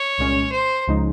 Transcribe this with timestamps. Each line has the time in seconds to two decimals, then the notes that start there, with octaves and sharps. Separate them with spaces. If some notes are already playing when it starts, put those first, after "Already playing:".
Already playing: C#5
0.18 C2 A#2 G#3 C#4
0.52 C5
0.87 C#2 C#3 F3 G#3 D#4